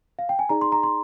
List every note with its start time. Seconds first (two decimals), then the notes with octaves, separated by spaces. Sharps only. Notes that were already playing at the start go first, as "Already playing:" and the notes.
0.19 F5
0.29 G5
0.39 G#5
0.49 D#4 G#4 D5 A#5
0.61 C6
0.72 A#5
0.83 C6